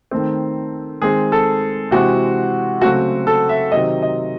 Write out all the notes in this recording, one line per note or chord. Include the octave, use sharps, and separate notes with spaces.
D#3 A3 C4
D#3 G#3 C4 G#4
A4
C3 E3 G#3 C4 F#4
C#3 F#3 A3 C4 F#4
A4
E5
C3 D#3 F#3 C4 D#5
D#5